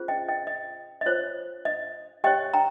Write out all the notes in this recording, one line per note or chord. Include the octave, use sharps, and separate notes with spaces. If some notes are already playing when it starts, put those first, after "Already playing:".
Already playing: C#4 F4 G#4 C5
D#5 G5
D#5 G5
D#5
D#5
F4 C5 C#5
D#5
G4 C#5 D#5 G5
G5 A#5